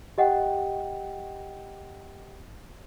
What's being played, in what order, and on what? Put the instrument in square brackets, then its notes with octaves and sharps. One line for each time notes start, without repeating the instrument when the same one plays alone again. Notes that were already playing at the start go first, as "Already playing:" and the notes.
[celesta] G4 D#5 F#5 G5